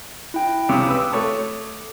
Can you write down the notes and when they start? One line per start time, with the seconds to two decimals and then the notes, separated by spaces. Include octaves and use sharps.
0.34 E4 G5
0.69 C#2 C3 D6 D#6
0.87 B4 E6
1.12 A3 C#5 A5